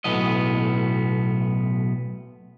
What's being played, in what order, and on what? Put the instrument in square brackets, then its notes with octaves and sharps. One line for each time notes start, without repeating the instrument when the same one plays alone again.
[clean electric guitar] B1 A2 B3 D#5